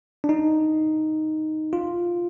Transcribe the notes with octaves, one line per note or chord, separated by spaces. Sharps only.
D4
D#4
F4